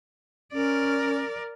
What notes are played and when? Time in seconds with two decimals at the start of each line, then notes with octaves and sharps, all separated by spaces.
0.53 C#4 A#4 D5